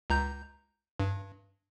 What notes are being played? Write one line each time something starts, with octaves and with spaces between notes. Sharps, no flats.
C#2 A#5 G6
G2